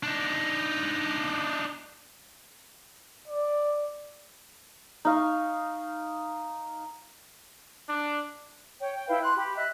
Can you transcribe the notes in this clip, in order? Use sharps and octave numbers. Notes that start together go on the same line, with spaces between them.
D4 D#4
D5
D#4 F5 C#6
D4
C#5 G5
G5
E4 B4 F5 G5
C6 F#6
G4 B5
D#5 E5 F#6